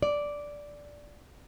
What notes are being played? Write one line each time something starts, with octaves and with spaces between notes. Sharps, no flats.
D5